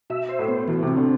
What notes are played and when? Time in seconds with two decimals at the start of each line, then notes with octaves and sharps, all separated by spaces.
0.10 B2 E5
0.29 C5
0.39 A2
0.48 B3
0.68 B2 E3
0.83 C3 C4
0.97 D3